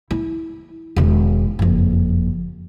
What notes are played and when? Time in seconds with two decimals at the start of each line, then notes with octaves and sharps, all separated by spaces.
0.11 E4
0.96 E1 D#3
1.59 F#1 F2